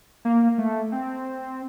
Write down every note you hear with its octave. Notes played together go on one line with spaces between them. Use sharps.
A#3
A3
C4